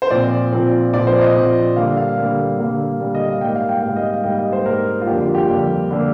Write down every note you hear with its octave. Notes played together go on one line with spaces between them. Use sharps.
C5
A#2 F3 C4 D5
A#2 F3 C4
A#2 F3 C4 D5
C5
D#5
A#2 F3 C4
D3 G3 A#3 D4 F5
F5
D3 G3 A#3 D4
D3 G3 A#3 D4 F5
D3 G3 A#3 D4
D#5
F5
G#2 G3 A#3 G5
F5
G5
G#2 G3 A#3 F5
D#5
F5
G#2 G3 A#3 G5
D#5
C5
G#2 G3 A#3 A#4
F4
F2 D3 G3 A#3 D4 G4
F4
G4
F2 D3 G3 A#3 D4
D3 G3 A#3 D4